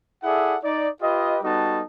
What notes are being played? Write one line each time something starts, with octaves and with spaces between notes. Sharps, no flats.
E4 G#4 A4 D5 E5 F#5
D#4 D5
F4 G4 B4 D#5
G3 B3 D#4 F#4 A4 A5